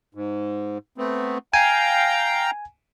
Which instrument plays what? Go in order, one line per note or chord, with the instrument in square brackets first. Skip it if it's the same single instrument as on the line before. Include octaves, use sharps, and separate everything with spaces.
[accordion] G#2
A3 B3 C4
[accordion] F5 G5 A#5 [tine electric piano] G#5